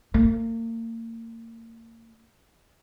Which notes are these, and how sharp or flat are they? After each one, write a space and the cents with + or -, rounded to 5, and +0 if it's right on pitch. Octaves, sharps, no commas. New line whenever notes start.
A#3 -35